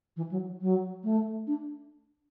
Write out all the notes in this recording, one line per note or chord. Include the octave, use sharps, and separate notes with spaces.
E3
F#3
F#3
A3
D4